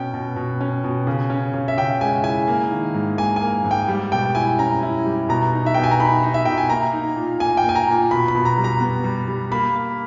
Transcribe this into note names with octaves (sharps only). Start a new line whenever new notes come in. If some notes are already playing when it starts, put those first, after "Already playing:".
Already playing: B2 C#4 G5
B2
B2
C#4
B2
C#3
C#4
C#3
E5
C#3 G5
G#3 G#5
E4 G#5
A#3
D#3
G#2
A#3 G#5
A#3 G#5
G#2
G5
G3
B2 G5
E4 G#5
C#4 A#5
E4
G3
B2 A#5
D#4
E5
B2 G5
G#5
A#5
D#4 B5
D#4
E5
B2 G5
G#5
A#3 A#5
D#4
A#2
A#2 G#5
G5
A#3
G#5
A#5
A#2
B2 B5
B5
B2
A#5
G3
A#5
B3
G3
G3
A#3 B5
A#3